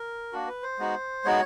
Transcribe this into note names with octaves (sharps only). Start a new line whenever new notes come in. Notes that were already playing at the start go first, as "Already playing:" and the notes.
Already playing: A#4
A#3 D4 F#4
B4
C5
G#3 B3 D#4 F#4
G#3 B3 D#4 F#4 C#5